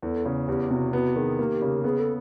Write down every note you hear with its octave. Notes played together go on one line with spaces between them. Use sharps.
E2 A4
C#3
E2 G4
C3 F#4
B3 F#4
D#3 G#4
A#3 G4
C#3
B3 G#4
A4